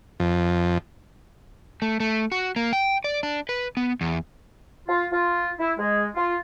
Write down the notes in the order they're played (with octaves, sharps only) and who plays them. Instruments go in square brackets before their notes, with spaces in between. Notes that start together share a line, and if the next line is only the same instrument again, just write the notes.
[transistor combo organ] F2
[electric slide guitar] A3
A3
F#4
A#3
G5
D5
D4
B4
B3
E2
[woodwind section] F4
F4
E4
G#3
F4